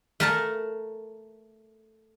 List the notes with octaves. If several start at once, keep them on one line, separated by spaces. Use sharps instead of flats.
A3 A#4 A5